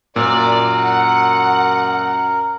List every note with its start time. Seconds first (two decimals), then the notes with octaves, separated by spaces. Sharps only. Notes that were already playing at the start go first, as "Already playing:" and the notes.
0.16 F#2 A#2 A#4 D5
0.77 F#5